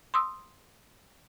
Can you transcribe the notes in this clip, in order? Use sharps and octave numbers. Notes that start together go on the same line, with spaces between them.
C6 D#6 E6